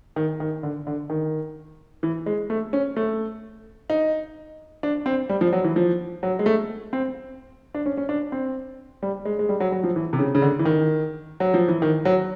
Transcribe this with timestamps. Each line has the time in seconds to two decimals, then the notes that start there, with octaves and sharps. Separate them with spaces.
0.16 D#3
0.40 D#3
0.63 D3
0.87 D3
1.10 D#3
2.03 E3
2.26 G#3
2.50 A3
2.73 C#4
2.97 A3
3.90 D#4
4.83 D4
5.06 C4
5.29 G3
5.41 F3
5.53 F#3
5.64 E3
5.76 F3
6.23 F#3
6.39 G#3
6.46 A3
6.93 C4
7.74 D4
7.86 C#4
7.97 C#4
8.09 D4
8.32 C4
9.03 G3
9.25 G#3
9.39 G#3
9.49 G3
9.60 F#3
9.72 F#3
9.84 F3
9.96 E3
10.13 C3
10.19 C#3
10.35 C#3
10.42 D3
10.59 E3
10.65 D#3
11.40 F#3
11.54 F3
11.68 E3
11.82 D#3
12.05 F#3